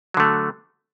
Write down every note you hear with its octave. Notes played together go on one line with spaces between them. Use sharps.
D3 F#3 A3